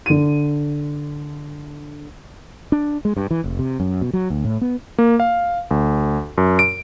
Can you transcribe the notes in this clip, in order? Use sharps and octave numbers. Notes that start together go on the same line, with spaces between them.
D3 D#7
D4
G#3
G2
E3
F1
C3
F#2
B2
F#3
D2
A2
B3
A#3
F5
D2
F#2
D7